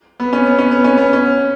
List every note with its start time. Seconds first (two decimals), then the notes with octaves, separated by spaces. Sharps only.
0.20 B3
0.33 C#4
0.46 B3
0.58 C#4
0.71 B3
0.84 C#4
0.97 B3
1.13 C#4